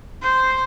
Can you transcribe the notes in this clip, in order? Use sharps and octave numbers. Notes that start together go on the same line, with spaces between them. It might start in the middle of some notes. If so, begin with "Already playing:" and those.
C5